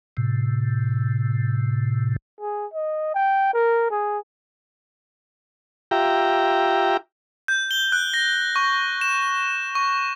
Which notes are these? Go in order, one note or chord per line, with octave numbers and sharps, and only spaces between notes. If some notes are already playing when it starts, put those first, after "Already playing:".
A2 C3
G#4
D#5
G5
A#4
G#4
F4 G4 E5 G5 A#5
G6
G7
F#6
A#6
C#6
E7
C#6